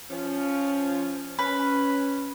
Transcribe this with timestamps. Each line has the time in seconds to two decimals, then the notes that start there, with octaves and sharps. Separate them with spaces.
0.11 F3 C#4
1.39 C#4 B4